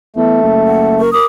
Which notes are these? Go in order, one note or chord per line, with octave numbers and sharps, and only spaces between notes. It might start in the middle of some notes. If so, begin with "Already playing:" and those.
E2 A3
F#1
F#5
A#4 C#6
A#4 D6 D#6